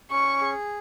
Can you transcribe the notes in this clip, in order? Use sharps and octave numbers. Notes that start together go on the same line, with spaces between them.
C#4 C#6
G#4